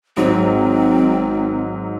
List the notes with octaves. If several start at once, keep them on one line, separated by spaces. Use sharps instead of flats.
G#1 G#2 F#3 C4